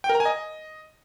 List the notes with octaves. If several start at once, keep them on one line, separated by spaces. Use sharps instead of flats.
G5
A#4
A#5
G#5
D#5